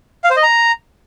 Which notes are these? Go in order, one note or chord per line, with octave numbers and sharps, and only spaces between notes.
F5
C5
D#5
A#5